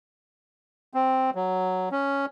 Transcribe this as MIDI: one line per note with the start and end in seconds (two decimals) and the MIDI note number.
0.94 1.30 60
1.35 1.89 54
1.92 2.26 61